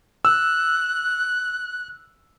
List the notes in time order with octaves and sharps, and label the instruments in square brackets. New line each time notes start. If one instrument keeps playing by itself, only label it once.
[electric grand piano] E6 [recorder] F#6